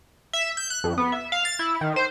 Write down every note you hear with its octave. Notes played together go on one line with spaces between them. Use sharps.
E5
G6
F#6
F2
B3
E5
F5
A6
E4
D#3
C5